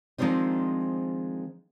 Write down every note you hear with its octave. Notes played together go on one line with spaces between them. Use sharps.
D#3 F3 G#3 C4 D4 D#4